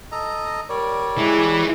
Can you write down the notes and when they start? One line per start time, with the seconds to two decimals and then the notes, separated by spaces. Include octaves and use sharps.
0.12 A4 D#5 A#5
0.69 G3 A#4 C#5 D5
1.18 E3 G#3